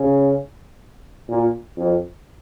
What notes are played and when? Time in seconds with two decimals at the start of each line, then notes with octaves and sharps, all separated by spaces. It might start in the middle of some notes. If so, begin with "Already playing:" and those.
Already playing: C#3
1.28 A#2
1.76 F2